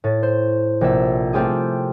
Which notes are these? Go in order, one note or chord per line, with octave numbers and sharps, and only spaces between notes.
A2 A6
C5
A#1 C3 E5
A3 C4 F4 G4 G#4